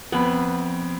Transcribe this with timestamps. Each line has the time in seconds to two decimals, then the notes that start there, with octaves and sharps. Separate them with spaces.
0.12 F2 B3 B5